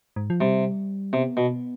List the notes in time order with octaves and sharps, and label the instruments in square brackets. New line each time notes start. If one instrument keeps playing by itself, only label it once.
[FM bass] G#2
F3
[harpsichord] C3 [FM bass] G3
[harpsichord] C3 [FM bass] B3
[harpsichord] B2